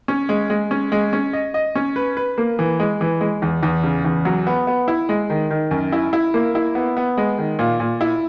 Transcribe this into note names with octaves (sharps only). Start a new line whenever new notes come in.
C#4
G#3
G#3
C#4
G#3
C#4
D#5
D#5
C#4
B4
B4
A#3
E3
G#3
E3
G#3
E2
E2
C#3
E2
F#3
B3
B3
E4
G#3
D#3
D#3
F#2
E4
E4
A#3
E4
B3
B3
G#3
D#3
A#2
A#2
E4